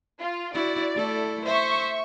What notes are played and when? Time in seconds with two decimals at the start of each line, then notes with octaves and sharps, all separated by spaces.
0.19 F4
0.54 E4 F#4 D5
0.95 A3 E4 A4
1.45 C5 E5 C#6